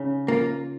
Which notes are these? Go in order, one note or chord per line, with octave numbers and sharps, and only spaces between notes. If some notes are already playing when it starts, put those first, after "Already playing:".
Already playing: C#3 D#4
A#3 F4